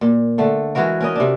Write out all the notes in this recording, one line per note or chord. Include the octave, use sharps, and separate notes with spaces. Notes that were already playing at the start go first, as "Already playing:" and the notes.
A#2
D3 A3
E3 G#3 F#4 A#4
C#4 A#4 D#5
C3 D4